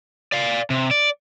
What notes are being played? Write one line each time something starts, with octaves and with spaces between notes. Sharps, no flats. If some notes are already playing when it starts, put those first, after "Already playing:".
D5 F5
C3
D5